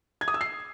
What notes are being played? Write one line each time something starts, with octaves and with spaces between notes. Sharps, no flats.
G#6
D#6
E6
C7